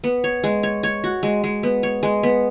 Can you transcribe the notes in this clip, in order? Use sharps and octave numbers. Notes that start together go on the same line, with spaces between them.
B3
C#5
G#3
C#5
C#5
F#4
G#3
G#3
B3
C#5
G#3
B3